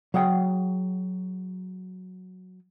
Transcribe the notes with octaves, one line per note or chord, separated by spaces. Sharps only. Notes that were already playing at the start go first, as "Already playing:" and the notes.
F#3 G#4 F#5 G5